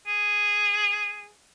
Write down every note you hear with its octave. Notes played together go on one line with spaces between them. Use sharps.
G#4